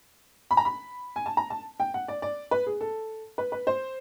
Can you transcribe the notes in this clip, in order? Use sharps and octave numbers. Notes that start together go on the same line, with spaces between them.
B5
A#5
B5
G#5
A5
A#5
A5
G5
F#5
D5
D5
B4
G#4
A4
B4
B4
C5